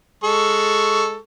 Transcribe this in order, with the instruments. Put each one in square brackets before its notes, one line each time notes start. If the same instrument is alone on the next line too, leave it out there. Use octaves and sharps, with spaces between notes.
[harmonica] G#3 A4 C#6